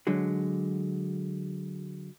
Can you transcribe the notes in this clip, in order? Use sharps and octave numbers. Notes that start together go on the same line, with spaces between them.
D3 F#3 G#3